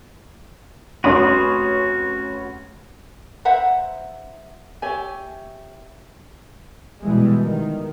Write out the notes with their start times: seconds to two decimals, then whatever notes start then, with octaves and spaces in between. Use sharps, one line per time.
1.04 F1 C#4 F#4 B5 C6 D#6
3.45 C5 E5 F#5 A#5
4.82 G4 C#5 E5 G#5
7.02 B2 E3 G3 G#3
7.40 D#3